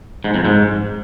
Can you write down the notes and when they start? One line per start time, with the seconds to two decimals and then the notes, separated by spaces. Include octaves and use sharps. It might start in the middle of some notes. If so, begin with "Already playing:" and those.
0.24 G#2
0.34 F2
0.45 G#2